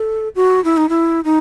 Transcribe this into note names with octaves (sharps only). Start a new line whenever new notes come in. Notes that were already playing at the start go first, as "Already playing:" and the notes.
Already playing: A4
F#4
E4
D#4
E4
D#4